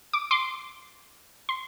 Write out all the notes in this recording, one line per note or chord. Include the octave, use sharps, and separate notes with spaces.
D6
C6 D6
C6